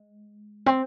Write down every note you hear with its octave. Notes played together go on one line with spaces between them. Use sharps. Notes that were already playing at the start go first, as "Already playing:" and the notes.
Already playing: G#3
C4